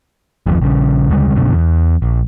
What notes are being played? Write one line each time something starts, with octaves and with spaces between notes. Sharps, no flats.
F#1 D#2 F3
A#1 C#3
D2 C#3 G3 G#3
F#1 F#2 B2 D3
E2
A#1